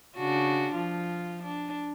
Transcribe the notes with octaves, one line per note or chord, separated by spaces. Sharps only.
C#3 D4 F#4
F3 F4
D4